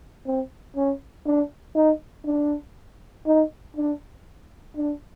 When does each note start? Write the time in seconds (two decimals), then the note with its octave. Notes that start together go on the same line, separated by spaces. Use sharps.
0.26 C4
0.76 C#4
1.26 D4
1.76 D#4
2.26 D4
3.27 D#4
3.77 D4
4.77 D4